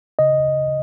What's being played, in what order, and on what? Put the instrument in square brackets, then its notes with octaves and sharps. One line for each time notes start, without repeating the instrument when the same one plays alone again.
[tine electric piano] C#3 D#5